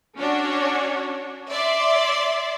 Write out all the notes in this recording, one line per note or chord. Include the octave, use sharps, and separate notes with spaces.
C#4 D4 F#4 C#5
D5 E5 C6